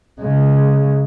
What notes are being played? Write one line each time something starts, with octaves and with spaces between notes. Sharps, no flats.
C#3 G#3